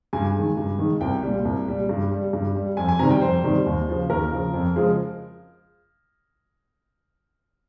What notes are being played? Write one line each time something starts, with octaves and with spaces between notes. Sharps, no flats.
G2 G#5
D#3 G#3
G2
D#3 G#3
C2 G5
A#2 G3
C2
A#2 G3
G2
G3
G2
G3
F2 G#5
G#5
C3 D#3 G3 A#5
G5
F2 C5
C3 D#3 G3
D#2
C#3 F3
D#2 A#4
C#3 F3
F2
C#3 F3 G#3